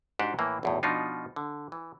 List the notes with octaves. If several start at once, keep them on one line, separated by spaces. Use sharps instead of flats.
G#2 D4 F#4 G4 C5 F#5
A2 E3 A#3
B1 E2 A2
B2 F3 D4 D#4 F4
D3
E3